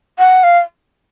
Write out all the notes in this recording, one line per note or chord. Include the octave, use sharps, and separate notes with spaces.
F#5
F5